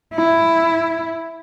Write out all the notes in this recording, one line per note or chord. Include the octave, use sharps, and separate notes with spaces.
E4